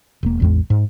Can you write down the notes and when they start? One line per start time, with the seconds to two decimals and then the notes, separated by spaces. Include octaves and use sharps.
0.23 E1 A#3
0.40 A1 E2 G#3
0.70 G#2